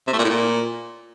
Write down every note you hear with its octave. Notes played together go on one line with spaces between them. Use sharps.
C3
A3
A#2
A2
A#2